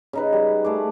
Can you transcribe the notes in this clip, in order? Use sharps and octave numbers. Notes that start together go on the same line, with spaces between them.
C#3 D#4 B4
G3
A3 G#4 D5